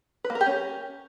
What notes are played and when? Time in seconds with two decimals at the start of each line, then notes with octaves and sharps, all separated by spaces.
0.24 B4
0.30 A#3
0.35 A#4
0.41 G4
0.46 C#4